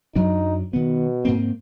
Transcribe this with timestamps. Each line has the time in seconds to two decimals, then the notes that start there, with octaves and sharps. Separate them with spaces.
0.16 F#2 F#3 D4 D#4
0.73 B2 D#3 B3
1.25 G#2 A#3 C4